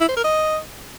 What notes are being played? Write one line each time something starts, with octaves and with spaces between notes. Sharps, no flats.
E4
C5
A#4
D#5